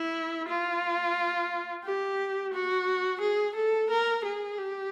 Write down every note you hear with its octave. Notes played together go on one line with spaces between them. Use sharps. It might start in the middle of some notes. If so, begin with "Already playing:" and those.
Already playing: E4
F4
G4
F#4
G#4
A4
A#4
G#4
G4